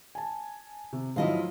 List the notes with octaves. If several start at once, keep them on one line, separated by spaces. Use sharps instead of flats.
G#5 A5
C3
G#2 F3 F#3 E4 D#5 F5